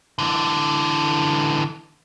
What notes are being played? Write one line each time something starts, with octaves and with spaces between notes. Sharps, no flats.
D3 E3